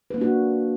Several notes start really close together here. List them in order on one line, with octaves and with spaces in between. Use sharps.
B4 A#3 D4 F#4